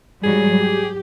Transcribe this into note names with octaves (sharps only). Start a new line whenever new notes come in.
G#2 F#3 G3 G#4
G4